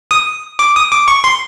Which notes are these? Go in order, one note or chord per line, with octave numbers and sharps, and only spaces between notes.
D#6
D6
D#6
D6
C#6
C6